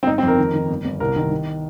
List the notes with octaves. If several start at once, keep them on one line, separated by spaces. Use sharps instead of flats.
C4
G1 D#4
C4
F2 A#4
D#3
D#3
G1
G1
C2 A#4
D#3
D#3